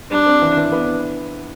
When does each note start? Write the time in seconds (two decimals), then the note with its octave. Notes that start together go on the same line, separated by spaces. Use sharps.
0.11 G3 D4
0.26 C4
0.42 E3
0.57 E3
0.72 B3